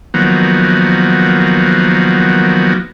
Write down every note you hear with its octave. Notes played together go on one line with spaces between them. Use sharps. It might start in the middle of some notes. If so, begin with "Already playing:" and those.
D#3 F3 F#3 A#3 B3